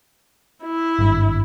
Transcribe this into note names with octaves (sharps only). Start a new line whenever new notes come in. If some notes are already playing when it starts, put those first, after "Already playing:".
E4
G#1 G2